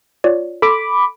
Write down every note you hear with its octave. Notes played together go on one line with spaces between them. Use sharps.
F4 C#5 D5
A4 B5 C6 D6